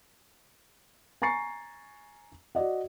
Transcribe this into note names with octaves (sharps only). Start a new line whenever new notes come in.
G#5 A#5 C#6 A6 C7 C#7
F#4 D5 D#5 F#5